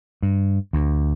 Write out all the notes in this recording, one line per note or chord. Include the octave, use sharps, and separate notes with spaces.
G2
D2